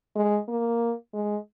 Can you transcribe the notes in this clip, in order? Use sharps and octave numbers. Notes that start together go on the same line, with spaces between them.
G#3
A#3
G#3